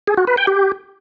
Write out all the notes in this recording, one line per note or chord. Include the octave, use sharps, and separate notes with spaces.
G#4
F#4
B4
G5
G4